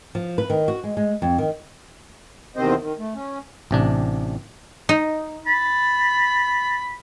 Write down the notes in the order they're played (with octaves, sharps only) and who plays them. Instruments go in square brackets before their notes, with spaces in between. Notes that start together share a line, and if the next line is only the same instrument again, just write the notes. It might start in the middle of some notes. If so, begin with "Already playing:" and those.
[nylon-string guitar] F3
B4
D#3
F#4
G#3
G#3
F2
D#3
[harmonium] E2 C3 D#3 C4 C5 D#5
D#3
A3
C#4
[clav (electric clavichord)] A1 C3 D4
[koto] D#4
[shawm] B5 [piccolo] A6